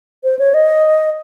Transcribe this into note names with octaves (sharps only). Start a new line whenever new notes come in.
C5
C#5
D#5